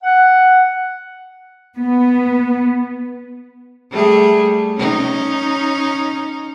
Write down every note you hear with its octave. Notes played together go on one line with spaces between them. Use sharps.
F#5
B3
G3 A3 G#4
C#4 D#4